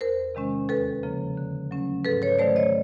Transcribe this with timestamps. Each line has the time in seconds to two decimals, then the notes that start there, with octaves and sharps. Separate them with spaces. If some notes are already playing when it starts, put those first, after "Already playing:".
0.01 E2 A#4 C5
0.35 C3 D#3 G#3 C#4
0.69 D#2 A4 B4
1.03 C#3 F3 A#3
1.37 D3
1.71 F#3 A3 C#4
2.05 G#2 A4 B4
2.22 B4 C#5
2.39 D#3 F#3 A3 C5 D5
2.56 C#5 D#5